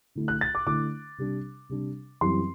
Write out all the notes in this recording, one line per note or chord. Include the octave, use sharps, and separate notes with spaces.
D3 A3 E4
F#6
A6
D6
D3 A3 E4 D6
C3 G3 D4
C3 G3 D4
F#2 E3 G3 C4 E4 C6